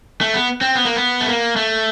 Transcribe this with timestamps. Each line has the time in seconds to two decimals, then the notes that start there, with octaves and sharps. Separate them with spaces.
0.21 A3
0.34 B3
0.61 C4
0.75 B3
0.85 A#3
0.97 B3
1.21 A3
1.29 A#3
1.56 A3